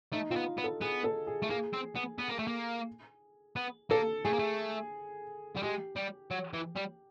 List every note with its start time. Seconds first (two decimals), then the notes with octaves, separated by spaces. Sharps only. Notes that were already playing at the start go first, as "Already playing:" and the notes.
0.12 A3 D#4
0.30 C4 F4
0.36 B3
0.58 B3
0.64 A4
0.81 B3 G#4
1.04 A4
1.27 G#4
1.42 A3
1.50 A#3 G#4
1.73 C4
1.96 B3
2.18 B3
2.29 A#3
2.39 A3
2.47 A#3
3.56 B3
3.90 A#3 A4
4.25 A3 G#4
4.33 A#3
4.39 A3
5.56 G3
5.62 G#3 G4
5.96 G3
6.31 F#3
6.54 E3
6.76 G3